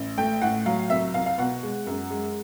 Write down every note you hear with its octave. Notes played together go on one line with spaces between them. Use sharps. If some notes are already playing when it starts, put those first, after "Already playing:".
Already playing: A1
A3 G5
A2 F#5
F#3 F5
C2 E5
C2 F5
F5
B2 F#5
G#3
F#2
G#3